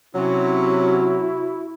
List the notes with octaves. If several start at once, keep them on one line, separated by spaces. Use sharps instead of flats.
C3 F#3 C#4 E4 F#4